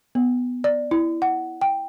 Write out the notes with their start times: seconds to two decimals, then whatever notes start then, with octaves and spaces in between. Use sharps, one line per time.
0.15 B3
0.64 D5
0.91 E4
1.22 F#5
1.61 G5